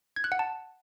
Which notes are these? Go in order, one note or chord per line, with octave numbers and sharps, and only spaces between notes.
G#6
F#6
F#5
A5